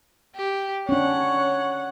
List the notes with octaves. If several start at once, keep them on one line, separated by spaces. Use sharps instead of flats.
G4
C#4 D4 C#5 F#5